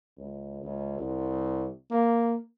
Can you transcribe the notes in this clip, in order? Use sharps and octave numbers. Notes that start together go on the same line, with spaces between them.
C#2
C#2
C2
A#3